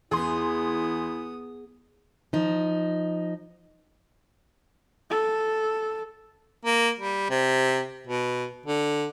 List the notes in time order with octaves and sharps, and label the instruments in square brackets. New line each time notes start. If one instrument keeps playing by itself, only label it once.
[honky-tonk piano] E2 C6 [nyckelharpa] B3 D#6 [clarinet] E4 [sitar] G#4
[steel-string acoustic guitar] F3 D#4
[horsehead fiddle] A4
[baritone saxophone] A#3
G3
C3
B2
D3